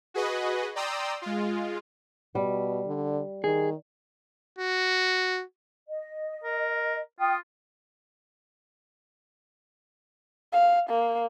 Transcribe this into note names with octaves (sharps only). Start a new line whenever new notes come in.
F#4 G#4 B4 D#5
D5 G5 A#5 C6 D#6 E6
G#3 F4
B2 G3
D3
D#3 G#4
F#4
D#5
A#4
F4 G5 D#6
F5
A#3